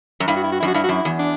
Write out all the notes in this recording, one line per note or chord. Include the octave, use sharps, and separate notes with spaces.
F#2
G2 E4
F#4
E4
F#4
F#2 E4
F#4
G2 E4
F#4
F#2 E4
E2
D4